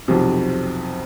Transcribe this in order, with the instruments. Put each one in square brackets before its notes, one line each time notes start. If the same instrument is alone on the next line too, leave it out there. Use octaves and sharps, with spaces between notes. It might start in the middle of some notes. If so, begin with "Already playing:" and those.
[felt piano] B1 F2 C3